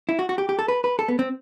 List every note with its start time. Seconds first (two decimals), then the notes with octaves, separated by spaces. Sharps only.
0.09 E4
0.19 F#4
0.29 F#4
0.38 G4
0.49 G4
0.59 A4
0.68 B4
0.84 B4
0.99 A4
1.08 B3
1.19 C4